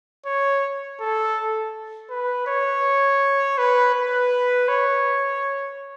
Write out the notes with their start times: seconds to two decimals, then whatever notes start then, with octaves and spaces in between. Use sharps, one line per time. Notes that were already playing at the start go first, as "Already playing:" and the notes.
0.26 C#5
1.00 A4
2.10 B4
2.47 C#5
3.58 B4
3.95 B4
4.68 C#5